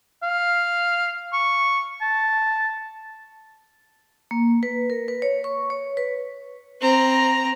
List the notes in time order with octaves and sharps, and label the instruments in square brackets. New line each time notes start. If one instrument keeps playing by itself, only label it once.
[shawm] F5
C#6
A5
[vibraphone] A#3
B4
A#4
B4
C#5
C#6
C#5
B4
[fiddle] C4 A#5